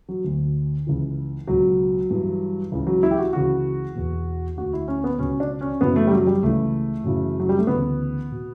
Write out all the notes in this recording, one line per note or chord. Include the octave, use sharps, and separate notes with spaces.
F#3
D2 D3
C#2 C#3 E3
C#2 B2 F#3
G2 E3
C#2 C#3 E3
F#3
E4
G4
F#4
C#2 C#3 E3 F#4
E2 B2
D2 D3 F#4
E4
C#4
B3
C#2 B2 C#4
D4
C#4
F#2 C#3 E3 B3
A3
G3
F#3
G3
C#2 C#3 E3 A3
F#2 C#3 E3
F#3
G3
A3
D2 C#3 E3 B3
B2